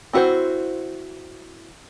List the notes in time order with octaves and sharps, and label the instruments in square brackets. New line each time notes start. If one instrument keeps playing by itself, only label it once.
[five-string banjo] C4 E4 F#4 A#4 C5